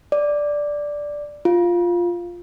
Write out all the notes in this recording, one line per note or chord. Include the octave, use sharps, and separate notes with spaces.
D5
F4